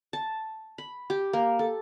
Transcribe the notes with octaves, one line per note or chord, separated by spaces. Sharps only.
A5
B5
G4
A#3
A4